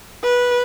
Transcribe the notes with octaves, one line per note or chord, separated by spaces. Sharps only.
B4